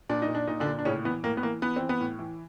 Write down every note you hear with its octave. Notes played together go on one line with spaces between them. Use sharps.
A#2 D4
D#4
A#2
D4
A#2 D#4
D3 D4
A#2
D4
A2 C#3 C#4
E3 B3
A2 A#3
B3
E3 A#3
E3 B3
E3 C4
B3
A2
E3